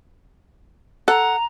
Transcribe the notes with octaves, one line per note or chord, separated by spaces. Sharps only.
A4 F#5 A#5